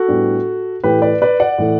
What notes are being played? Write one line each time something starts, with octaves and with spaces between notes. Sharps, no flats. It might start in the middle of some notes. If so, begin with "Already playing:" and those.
Already playing: F#4 A4
A2 G3 B3 D4
A2 E3 A3 G4 B4
B4 D5
B4 D5
D5 F#5
A2 E3 A3